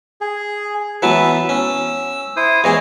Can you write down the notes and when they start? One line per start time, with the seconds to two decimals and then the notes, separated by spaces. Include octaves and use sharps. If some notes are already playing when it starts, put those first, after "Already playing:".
0.21 G#4
1.02 E3 F#3 B3 B4 E5 A5
1.49 C#4 E6
2.36 E4 C5 D#6
2.64 E2 E3 G#4 C#5 D#5